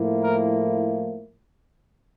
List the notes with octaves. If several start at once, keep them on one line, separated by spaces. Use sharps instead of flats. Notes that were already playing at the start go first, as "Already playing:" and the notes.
Already playing: A2 F3 A#3 E4
A#4